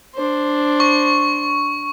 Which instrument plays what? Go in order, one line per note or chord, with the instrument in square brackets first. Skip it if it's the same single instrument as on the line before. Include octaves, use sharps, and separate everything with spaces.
[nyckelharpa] D4 C5
[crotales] C#6